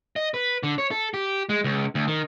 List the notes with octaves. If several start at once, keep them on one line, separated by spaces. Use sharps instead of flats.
D#5
B4
D3
C#5
A4
G4
G#3
C#2
D2
D#3